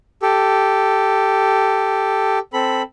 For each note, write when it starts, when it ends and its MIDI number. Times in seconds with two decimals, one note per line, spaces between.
0.22 2.39 67
0.22 2.39 69
2.53 2.82 60
2.53 2.82 69
2.53 2.82 83